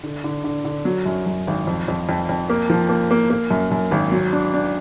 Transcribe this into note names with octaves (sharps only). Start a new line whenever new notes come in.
D3
D3
D3
D3
F#3
F#2
F#2
G#1
F2
F2
F2
F2
A#3
F3
A#3
A#3
A#3
F#2
F#2
G#1
F#3
D4
D4